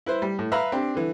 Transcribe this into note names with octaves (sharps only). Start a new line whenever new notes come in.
E4 B4 C5
G3
A2
B4 E5 F5 A#5 B5
C4 D4 G4
D3 E3